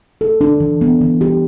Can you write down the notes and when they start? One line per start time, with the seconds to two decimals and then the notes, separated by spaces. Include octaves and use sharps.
0.21 A4
0.41 D4
0.60 E3
0.81 B3
1.01 E3
1.21 G4